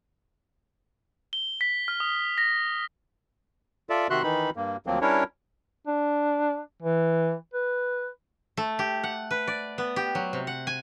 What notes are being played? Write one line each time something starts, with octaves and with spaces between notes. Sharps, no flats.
G7
B6
F6
D#6
A#6
F4 A4 D5 E5
C3 D#3 F#4 E5 C6 F#6
D#3 E3 D#4 B5
G2 A#3
D2 F3 F#3 A#3 C4
G3 C#4 D4 E4 A#4 C#5
D4
E3
B4
A3
G4
F#5
B4
D5
B3
G4
F#3
C3
F#5
G#5